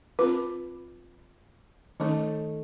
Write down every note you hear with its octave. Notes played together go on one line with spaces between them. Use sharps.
C4 F4 B4 D6
D#3 A3 C#4 D#4